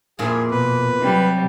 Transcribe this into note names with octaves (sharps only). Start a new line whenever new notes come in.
F2 A#2 E4 G#4
B2 B4
C3 F#3 G3